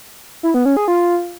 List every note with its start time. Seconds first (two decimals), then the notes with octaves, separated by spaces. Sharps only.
0.43 E4
0.54 B3
0.65 C#4
0.77 G#4
0.88 F4